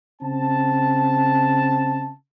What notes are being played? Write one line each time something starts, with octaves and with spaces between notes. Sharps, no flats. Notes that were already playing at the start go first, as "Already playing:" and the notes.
C#3 C4 A5